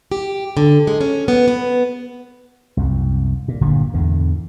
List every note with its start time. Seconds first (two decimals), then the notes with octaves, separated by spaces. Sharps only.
0.12 G4
0.57 D3
0.87 G#3
1.01 C#4
1.28 B3
1.48 B3
2.77 C2 F#2
3.48 A#2
3.61 G1 A#2 D3 G3
3.94 E2 G#2 D3